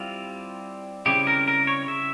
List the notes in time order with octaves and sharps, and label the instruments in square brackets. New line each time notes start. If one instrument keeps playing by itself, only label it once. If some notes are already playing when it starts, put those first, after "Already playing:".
Already playing: [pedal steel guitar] G3 C4 E4 F4
C#3 G3 C4 E4 G4
A#4
A#4
C#5
E5